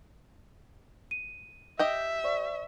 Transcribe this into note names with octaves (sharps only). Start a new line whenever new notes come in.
D#7
G4 D#5 E5 G5
C5 D5 C#6